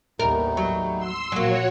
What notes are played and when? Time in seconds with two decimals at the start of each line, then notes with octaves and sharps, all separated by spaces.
0.19 A1 D#2 G3 A3 B3 D#4 A#4
0.57 F#3
0.98 C6 E6
1.32 A#1 F#3 A#3 F#4 C#5 G#5